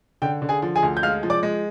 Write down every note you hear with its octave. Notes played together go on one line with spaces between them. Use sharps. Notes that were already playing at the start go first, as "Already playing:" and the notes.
D3 G5
D3
G#4 G#5
F3
G#4 G#5
D2
G6
G#3 F5 F6
F3
D5 D6
G#3